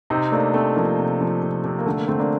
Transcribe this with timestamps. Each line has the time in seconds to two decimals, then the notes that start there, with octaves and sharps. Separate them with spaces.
0.10 C3 C4 D#4
0.32 A3 A#3 D4
0.54 A3 C4
0.76 F3 A#3
0.99 C3
1.21 F3
1.43 C3
1.64 C3
1.79 A#3
1.86 D3 A3
1.97 A#3
2.08 D3 A3 C4
2.19 A#3 D4